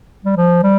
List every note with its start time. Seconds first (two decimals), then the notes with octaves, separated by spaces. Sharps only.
0.25 G3
0.37 F3
0.63 G3